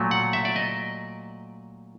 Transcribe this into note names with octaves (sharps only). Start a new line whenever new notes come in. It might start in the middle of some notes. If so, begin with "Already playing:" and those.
Already playing: A#2 F#3 A3
F#5
E5
D5
D#5